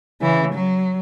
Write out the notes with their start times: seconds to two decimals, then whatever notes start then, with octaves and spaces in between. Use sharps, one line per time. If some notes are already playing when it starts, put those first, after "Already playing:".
0.21 C#3 E3
0.53 F#3